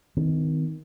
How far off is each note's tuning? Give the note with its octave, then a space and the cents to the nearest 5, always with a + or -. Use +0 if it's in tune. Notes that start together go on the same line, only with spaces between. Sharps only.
D#3 +15 C4 -45